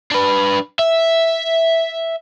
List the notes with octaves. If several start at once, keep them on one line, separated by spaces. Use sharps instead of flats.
D4 B4
E5